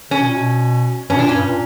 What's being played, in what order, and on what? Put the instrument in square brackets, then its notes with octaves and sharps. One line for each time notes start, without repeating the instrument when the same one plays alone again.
[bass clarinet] C#3 [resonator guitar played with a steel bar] C#4
[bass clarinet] B2
A#2
B2
[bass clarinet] G2 [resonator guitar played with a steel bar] C#4
[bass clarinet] B2
[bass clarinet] A#2 [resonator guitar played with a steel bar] D4
[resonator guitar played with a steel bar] C#4
[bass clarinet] G2
A#2